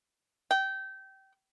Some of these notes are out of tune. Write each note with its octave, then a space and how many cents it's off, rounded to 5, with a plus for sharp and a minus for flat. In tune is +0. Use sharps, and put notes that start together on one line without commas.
G5 -25